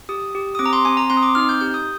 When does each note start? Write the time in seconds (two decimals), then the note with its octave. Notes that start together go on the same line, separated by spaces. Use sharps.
0.09 G4 D#6
0.35 G4
0.55 D#6
0.59 C4 D6
0.66 A#5
0.73 C6
0.85 C4 G#5
0.97 A#5
1.10 C4 C6
1.17 D#6
1.23 D6
1.35 D#4 F6
1.49 G6
1.60 G4 G6
1.74 D#6